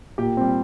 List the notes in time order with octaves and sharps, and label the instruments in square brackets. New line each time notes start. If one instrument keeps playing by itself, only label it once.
[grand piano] A#2 G4 G5
G3 C4